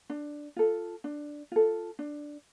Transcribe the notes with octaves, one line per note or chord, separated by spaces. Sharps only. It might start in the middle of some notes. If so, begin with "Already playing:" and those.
D4
F4 A4
D4
F4 A4
D4